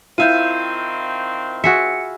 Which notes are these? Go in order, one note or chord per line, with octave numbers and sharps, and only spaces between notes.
D#3 C4 E4 F4 G6 D#7
F#4 G#4 E5 C#7